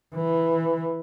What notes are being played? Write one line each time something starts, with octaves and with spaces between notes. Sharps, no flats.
E3